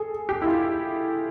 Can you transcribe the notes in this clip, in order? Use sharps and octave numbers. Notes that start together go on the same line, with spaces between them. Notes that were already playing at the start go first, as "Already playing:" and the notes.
Already playing: G#4 A4
G4
E4
F4